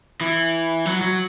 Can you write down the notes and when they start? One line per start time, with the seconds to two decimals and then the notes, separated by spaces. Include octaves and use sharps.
0.21 E3
0.86 F#3
1.01 F#3